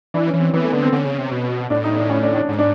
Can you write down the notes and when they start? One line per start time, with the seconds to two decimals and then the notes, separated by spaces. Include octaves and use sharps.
0.14 E3 D4
0.27 C#4
0.34 E3
0.39 C4
0.53 E3 B3
0.63 A3
0.72 D3 B3
0.82 C4
0.92 D3 C#4
1.05 C#3
1.18 C3
1.31 B2
1.70 A2 D4
1.84 D#4
1.96 D4
2.10 C#4
2.23 D4
2.36 D4
2.49 G#2
2.59 D4